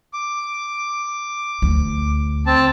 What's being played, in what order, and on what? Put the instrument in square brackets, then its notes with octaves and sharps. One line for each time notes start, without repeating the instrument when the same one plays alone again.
[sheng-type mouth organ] D6
[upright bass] D2
[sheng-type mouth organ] C4 A5